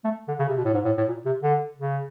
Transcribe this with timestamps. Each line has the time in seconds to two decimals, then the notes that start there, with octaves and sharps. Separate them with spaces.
0.04 A3
0.28 D3
0.39 C#3
0.48 C3
0.57 B2
0.65 A2
0.74 G#2
0.85 A2
0.97 A2
1.08 A#2
1.26 C3
1.43 D3
1.78 C#3